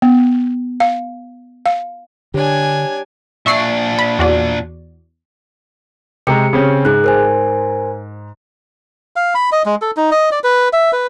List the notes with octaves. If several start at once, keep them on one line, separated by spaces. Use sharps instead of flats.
B3
F5
F5
D3 D4 G4 C#5 G#5
A#2 D4 E5 C#6 C7
B5
E2 F#4 D5
C3 G#3 G4 A#5 C#7
C#3 C4 C#4
G#2 G#4 F#6
A#4 C5 G#5
F5
B5
D#5
G#3
A4
D#4
D#5
D5
B4
E5
B4